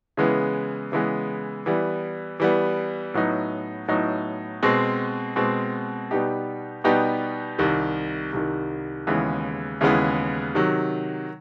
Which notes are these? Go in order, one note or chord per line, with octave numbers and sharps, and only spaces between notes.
C#3 E3 G#3 B3
C#3 E3 G#3 B3
E3 G3 B3
E3 G3 B3
A2 F#3 B3 D#4
A2 F#3 B3 D#4
B2 G#3 C4
B2 G#3 C4
B2 G3 B3 D#4 G4
B2 G3 B3 D#4 G4
C2 C3 D#3
C2 C3 D#3
D#2 C#3 E3 G#3 B3
D#2 C#3 E3 G#3 B3
C3 D#3 F#3